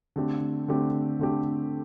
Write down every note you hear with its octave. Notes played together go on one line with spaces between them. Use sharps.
D3 A3 C4 G4
D3 A3 C4 G4
D3 A3 C4 G4